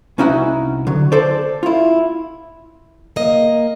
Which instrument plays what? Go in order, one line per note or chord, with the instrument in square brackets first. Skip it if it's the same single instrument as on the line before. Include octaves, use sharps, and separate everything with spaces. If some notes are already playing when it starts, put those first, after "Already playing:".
[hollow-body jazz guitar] C2 C#4 D#4 E4 F#4 F#5
D3 F#3
A4 C5 D5
E4 F4
[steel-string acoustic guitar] A#3 D#5